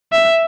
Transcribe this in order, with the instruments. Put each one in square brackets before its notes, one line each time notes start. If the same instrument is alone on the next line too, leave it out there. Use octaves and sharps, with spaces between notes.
[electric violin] E5